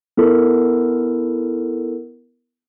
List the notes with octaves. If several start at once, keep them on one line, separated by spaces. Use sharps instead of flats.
B3 E4 A4 A#4